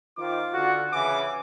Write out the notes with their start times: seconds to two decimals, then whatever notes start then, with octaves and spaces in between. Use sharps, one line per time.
0.18 D#3 F4 C5 D6
0.54 D3 F#4
0.93 C#3 E3 G#5 D6